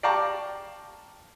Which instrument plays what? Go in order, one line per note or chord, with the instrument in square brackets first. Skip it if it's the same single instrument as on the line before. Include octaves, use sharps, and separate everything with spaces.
[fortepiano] D5 F5 G5 A5 A#5 C#6